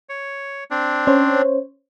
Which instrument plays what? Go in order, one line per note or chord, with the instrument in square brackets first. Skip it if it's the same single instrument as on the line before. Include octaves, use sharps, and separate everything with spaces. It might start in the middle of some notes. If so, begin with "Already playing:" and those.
[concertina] C#5
C4 D4
[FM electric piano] C#4 C5 C#5